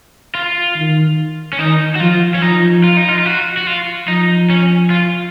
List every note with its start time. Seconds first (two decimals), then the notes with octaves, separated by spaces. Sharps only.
0.35 F4
0.76 D#3
1.53 C#4
1.59 D#3 D#4
1.95 F#4
2.00 F3 F4
2.35 C#4
2.42 F3 D#4
2.84 F4
2.97 D#4
3.08 F4
3.19 F4
3.25 F#4
3.57 F#4
3.67 F4
4.08 F3 D#4
4.50 C#4
4.90 F4